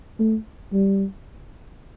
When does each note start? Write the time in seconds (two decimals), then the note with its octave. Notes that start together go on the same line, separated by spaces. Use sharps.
0.19 A3
0.73 G3